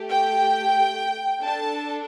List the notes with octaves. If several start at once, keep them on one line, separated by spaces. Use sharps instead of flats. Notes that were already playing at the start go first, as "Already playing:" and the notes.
Already playing: A3 G4
G5
D4 A4 A5